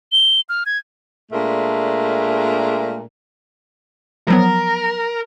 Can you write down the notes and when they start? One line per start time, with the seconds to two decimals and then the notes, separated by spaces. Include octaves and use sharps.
0.12 G7
0.49 F6
0.66 G#6
1.32 A#2 G#3 A3 D4 A#4
4.28 F3 F#3 B3 A#4